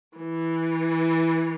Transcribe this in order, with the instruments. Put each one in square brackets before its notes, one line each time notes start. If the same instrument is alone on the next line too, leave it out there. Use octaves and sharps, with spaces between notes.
[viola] E3